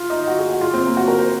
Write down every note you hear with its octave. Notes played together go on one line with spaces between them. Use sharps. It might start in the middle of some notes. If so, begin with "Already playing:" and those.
Already playing: F4
D#4
F#4
G#4
F#4
F4
C4
A#3
F#4
A#4
C5